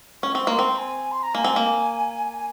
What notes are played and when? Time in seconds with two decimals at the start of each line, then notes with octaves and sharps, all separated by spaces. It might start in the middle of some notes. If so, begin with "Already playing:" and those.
0.23 C#4 C#6
0.35 C4
0.47 A#3 C6
0.59 C4
0.78 G#5
1.12 C6
1.23 A#5
1.35 A#3 G#5
1.44 C4
1.56 A#3
2.36 G#5